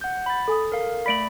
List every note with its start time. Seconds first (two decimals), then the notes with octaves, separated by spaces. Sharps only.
0.01 F#5 G6
0.26 B5 A6
0.48 A4 G#5 D#6
0.72 A#4 F5
1.06 A3 D5 B5 B6 D7 F#7